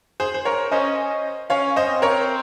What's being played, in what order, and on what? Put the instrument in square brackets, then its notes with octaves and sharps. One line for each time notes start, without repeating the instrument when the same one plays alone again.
[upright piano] G#4 C5
C5
A#4 C#5
[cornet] C#4 [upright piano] C5 D#5
[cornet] C#4 [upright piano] C#5 F5
[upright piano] C5 D#5
[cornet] C4
[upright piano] A#4 C#5